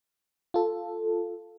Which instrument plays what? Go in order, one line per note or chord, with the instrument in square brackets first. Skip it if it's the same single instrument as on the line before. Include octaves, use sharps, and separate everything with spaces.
[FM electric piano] F4 A4